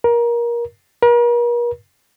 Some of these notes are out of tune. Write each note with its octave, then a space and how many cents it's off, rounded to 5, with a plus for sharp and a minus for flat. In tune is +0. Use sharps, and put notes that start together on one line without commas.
A#4 +25
A#4 +45